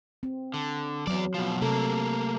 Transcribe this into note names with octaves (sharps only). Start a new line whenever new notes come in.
C4
D3
E2 F#3 D5
B2 F3
C3 A3 A#3 A4